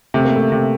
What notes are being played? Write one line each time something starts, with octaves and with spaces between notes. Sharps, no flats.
C3 A3
A#3
A3
C3